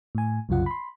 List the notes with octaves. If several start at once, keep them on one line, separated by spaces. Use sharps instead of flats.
A2 G#5
C2 F#2 C#3 F4 F#5
B5 C6